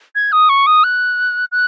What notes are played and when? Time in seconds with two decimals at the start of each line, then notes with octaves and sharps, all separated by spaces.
0.15 G#6
0.32 D#6
0.49 C#6
0.67 D#6
0.84 F#6
1.52 F#6